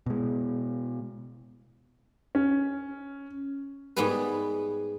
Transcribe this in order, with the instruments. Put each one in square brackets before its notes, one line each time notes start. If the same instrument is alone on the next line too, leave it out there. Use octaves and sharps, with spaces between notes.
[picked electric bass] B2 G#3
[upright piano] C#4
[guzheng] G#2 G3 B3 G#4 B4